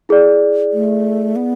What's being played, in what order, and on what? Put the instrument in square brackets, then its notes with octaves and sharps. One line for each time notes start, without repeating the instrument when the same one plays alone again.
[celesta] E4 G#4 D5
[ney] A3
B3